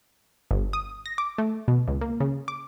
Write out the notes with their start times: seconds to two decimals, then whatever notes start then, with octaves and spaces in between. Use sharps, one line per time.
0.51 G1
0.73 D#6
1.06 A#6
1.18 D6
1.38 A3
1.68 B2
1.88 C#2
2.01 A#3
2.20 C#3
2.48 D6